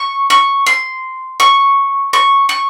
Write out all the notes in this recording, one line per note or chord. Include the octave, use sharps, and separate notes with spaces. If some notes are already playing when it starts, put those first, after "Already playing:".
Already playing: C#6
C#6
C6
C#6
C#6
C#6